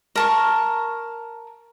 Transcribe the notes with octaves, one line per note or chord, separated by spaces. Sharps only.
A#4 A5 C#6